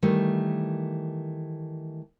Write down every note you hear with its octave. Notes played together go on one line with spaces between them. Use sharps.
D#3 E3 G3 A3